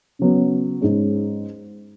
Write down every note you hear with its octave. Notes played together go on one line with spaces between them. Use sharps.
C#3 F#3 B3
G#2 G#3 C#4